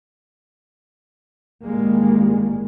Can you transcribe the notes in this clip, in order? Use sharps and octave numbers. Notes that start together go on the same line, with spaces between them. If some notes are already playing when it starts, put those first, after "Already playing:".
G1 A2 D#3 G3 G#3 A#3